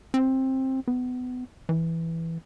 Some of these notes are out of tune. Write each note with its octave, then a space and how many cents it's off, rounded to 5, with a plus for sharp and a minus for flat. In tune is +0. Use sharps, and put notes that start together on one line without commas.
C4 +15
B3 +25
E3 +0